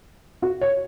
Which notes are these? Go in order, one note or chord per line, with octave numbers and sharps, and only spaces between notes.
F#4
C#5